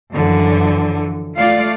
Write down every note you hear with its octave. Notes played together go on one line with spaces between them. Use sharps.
F#2 D3 E3 F3
A3 F4 D5 F5